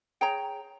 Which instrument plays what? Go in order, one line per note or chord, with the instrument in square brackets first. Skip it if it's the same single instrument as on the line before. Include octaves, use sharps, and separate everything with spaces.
[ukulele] G#4 C#5 G5 A#5